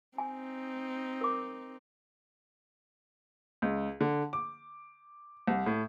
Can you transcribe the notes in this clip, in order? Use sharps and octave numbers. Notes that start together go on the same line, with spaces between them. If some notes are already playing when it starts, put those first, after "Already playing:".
C4 D#4 G#5
A#4 D6
C#2
D3
D6
C2
A2